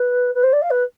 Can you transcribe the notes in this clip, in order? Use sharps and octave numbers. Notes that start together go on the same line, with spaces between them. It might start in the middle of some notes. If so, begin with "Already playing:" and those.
Already playing: B4
B4
C5
D5
F5
B4